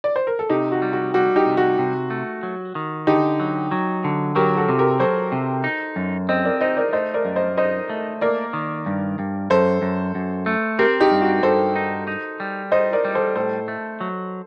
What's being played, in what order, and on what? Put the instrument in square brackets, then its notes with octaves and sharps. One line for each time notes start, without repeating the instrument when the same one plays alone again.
[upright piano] D5
C5
A#4
A4
[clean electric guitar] C3 [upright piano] D#4 G4
[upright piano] F#4
[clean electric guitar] G3
[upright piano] F#4
[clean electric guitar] G3 [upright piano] F#4
[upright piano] D#4 G4
[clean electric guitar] C3
[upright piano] F#4
[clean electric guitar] C3
A3
F#3
D#3
[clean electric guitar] D3 [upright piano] D#4 G4
[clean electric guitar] F#3
F#3
D3
[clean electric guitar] F#3 [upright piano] G4 A#4
[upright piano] F#4 A4
[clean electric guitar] C3
[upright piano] G4 A#4
[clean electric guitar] F#3 [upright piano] A4 C5
[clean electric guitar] C3
D#4
F#2
[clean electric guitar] C4 [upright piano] C5 D#5
[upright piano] A#4 D5
[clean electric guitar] D#4 [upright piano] C5 D#5
[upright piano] A#4 D5
[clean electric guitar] A3 [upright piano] C5 D#5
[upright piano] A#4 D5
[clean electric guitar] F#2
[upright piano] C5 D#5
[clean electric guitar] D#4 [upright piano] C5 D#5
[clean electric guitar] A3
[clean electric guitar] A#3 [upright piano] A#4 D5
[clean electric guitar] D#3
G2
G2
[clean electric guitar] F#2 [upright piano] A4 C5
[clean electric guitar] F#2
F#2
A3
[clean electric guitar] C4 [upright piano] G4 A#4
[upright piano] D#4 G4
[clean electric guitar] G2
[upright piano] F#4
[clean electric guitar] G2 [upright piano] A4 C5
[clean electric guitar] D#4
D#4
G3
[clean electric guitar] D#4 [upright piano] C5 D#5
[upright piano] A#4 D5
[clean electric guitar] G3
[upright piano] A4 C5
[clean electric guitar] A2 [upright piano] A4 C5
[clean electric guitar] A3
F#3